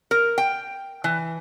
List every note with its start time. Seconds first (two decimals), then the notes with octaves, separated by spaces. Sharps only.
0.11 A#4
0.38 G5
1.04 E3